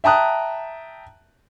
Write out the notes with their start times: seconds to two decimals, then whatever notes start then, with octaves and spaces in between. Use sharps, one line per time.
0.04 E5 G5 A5 A#5 D#6 F#6